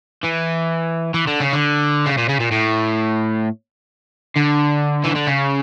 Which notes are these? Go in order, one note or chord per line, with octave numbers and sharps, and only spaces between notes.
E3
E3
D3
C#3
D3
C#3
A#2
C#3
A#2
A2
D3
E3
D3
C#3